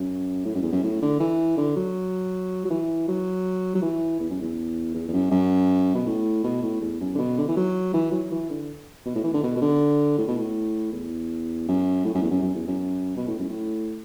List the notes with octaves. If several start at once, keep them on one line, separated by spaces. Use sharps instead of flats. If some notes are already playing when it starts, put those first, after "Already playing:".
Already playing: F#2
A2
F#2
E2
F#2
A2
D3
E3
D3
F#3
F#3
E3
F#3
F#3
E3
E2
F#2
E2
E2
E2
F#2
F#2
B2
A2
B2
A2
E2
F#2
D3
B2
D3
E3
F#3
E3
F#3
E3
D3
B2
A2
E3
D3
B2
B2
D3
A2
B2
A2
E2
F#2
A2
F#2
E2
F#2
F#2
E2
F#2
B2
A2
F#2
A2